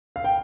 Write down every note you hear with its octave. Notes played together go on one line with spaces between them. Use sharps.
F5
G5